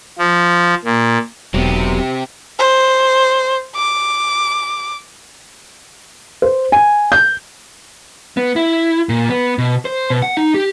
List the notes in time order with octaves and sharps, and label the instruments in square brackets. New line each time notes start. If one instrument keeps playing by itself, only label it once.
[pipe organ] F3
A#2
[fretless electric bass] E1 [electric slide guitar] F#3 B3 [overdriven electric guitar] C4 G4
[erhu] C5
D6
[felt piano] C5
G#5
G6
[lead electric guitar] B3
E4
A#2
B3
B2
C5
B2
F#5
D#4
G4